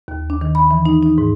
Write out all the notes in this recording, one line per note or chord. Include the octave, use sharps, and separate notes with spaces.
D#2
D4
D#3
B5
E3
D#4
D#4
G#2